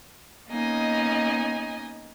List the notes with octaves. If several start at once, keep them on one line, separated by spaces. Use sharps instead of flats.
A#3 B3 C#4 D#4 D#5 G#5